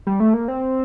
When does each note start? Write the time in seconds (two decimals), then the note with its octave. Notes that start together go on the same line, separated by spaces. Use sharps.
0.07 G3
0.20 A3
0.34 A#3
0.48 C4